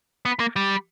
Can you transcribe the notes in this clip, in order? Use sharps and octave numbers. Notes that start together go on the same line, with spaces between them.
B3
A#3
G3